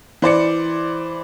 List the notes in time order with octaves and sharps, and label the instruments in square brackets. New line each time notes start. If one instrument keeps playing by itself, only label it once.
[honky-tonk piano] E3 C5 D5 C#7